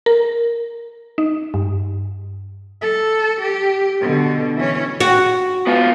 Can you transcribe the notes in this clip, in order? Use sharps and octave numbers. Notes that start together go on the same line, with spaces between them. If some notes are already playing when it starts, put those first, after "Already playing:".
A#4
D#4
G2
A4
G4
B2 D3
E3 C#4
F#4
B3 F4